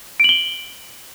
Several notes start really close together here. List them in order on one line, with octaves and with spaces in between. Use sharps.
D7 F#7 G7